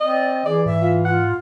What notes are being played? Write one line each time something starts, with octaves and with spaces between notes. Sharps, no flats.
C4 D5 D#5
E3 G#4 D5
G#2 E5
F4
F4 F#5